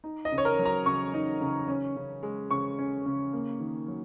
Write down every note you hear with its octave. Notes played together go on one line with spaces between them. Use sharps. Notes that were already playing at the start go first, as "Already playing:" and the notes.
D#4
D#5
C#3
C#5
A#4
F#3
A#5
C#3 C#6
D#4
C#3
C#4
C#3
G#3
C#3 C#6
C#4
C#3
A#3
D#3
F#3